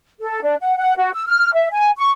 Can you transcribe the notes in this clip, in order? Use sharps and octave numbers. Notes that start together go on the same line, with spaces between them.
A4
D4
F#5
F#5
F#4
E6
F6
E5
G#5
C#6